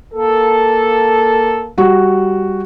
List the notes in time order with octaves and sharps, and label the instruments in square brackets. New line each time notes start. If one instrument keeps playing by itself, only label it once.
[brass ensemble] A#3 A4
[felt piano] G3 F#4